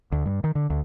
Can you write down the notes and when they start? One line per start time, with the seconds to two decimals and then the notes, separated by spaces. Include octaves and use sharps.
0.12 D2
0.26 G2
0.44 D#3
0.55 D3
0.70 D2